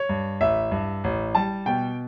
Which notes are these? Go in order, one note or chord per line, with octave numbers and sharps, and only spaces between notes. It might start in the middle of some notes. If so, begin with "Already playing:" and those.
Already playing: C#5
G2
A1 E5
G2
A1
G3 A5
B2 G5